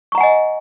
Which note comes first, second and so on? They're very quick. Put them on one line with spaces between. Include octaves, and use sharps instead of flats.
C#6 A#5 F#5 G#5 D#5